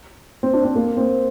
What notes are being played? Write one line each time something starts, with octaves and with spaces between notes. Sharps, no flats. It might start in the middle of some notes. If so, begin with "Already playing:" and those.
C4
D4
C4
A#3
C4